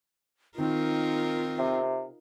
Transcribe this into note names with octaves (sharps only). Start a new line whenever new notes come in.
D#3 C4 D#4 F4 A#4
C3